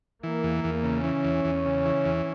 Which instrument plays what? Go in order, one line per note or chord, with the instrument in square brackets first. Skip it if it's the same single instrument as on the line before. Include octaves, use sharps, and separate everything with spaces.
[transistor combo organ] E3 [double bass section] A#3
[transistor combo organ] E2
E2
C#3
[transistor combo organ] E3 [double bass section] C#4
[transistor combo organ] E2
E2
C#3
E3
E2